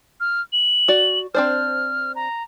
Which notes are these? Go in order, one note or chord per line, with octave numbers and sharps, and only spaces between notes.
F6
F#7
F#4 D5
C4 D4 C5 F6
A#5